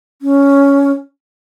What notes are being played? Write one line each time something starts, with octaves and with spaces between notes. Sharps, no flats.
C#4